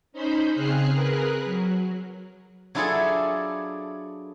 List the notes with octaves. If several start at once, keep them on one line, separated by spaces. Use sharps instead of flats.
C#4 D#4 C5 B5 G6
C#3 C4 G#4 F6 F#6 C7
G#4 A#4 B4 F#6
F#3
F#3 D4 E4 F4 G#4 A4